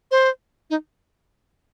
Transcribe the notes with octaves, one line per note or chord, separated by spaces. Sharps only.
C5
D#4